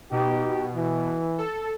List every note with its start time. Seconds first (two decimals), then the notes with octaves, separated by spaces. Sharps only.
0.11 B2 D#4 F#4 G4
0.75 E3
1.38 A4